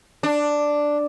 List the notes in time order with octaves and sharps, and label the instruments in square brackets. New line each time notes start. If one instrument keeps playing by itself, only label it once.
[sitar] D4